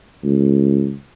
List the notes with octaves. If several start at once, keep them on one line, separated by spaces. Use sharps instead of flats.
C#2